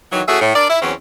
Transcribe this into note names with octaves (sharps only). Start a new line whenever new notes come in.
D#3 E3 F#3
A3 C#4 F#4 G#4 E5
A2
D4 A#4 D5
E4
E2 E3 F#3 C4 C#4